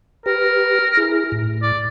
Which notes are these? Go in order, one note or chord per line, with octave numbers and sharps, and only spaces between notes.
G4 A#4 B4
E4 G#4
A2
D5